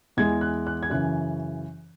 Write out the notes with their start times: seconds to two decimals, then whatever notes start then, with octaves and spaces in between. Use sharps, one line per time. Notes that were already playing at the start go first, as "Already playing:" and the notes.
0.17 E2 E3 G#3 G#6
0.41 F#6
0.67 F#6
0.83 G#6
0.90 F#2 C#3 E3 F#6